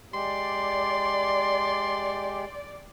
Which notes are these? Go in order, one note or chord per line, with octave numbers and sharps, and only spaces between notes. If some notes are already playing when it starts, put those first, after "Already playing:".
G#3 G4 D5 C6